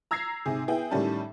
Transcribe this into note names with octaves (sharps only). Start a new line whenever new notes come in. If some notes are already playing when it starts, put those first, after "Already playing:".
A#5 E6 G#6 A#6 C7
G#2 C3 G#4
B3 E4 G#4 G5
A2 D#3 G3 C#4 A5